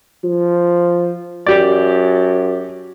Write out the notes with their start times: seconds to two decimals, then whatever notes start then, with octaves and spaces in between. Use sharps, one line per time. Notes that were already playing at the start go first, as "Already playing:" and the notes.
0.24 F3
1.47 F#2 G4 D5